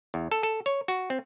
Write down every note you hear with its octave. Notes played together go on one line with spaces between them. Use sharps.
E2
A4
A4
C#5
F#4
C4